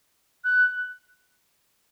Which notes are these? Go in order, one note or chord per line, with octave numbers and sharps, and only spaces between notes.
F#6